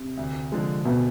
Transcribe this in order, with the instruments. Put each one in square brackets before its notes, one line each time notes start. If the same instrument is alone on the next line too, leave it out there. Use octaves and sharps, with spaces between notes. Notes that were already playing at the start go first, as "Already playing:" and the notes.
Already playing: [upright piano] C3
[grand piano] D2
D3 F3 G#3
[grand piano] D2 [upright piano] B2